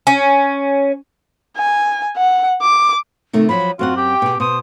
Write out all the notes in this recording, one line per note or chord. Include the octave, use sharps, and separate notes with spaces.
C#4
G#5
F#5
D6
C3 D#3 A3
F3 F#3 B5
F#2 C4 F4 F#4 F#5
G4 G5
B2 G#4
B2 C5 D#6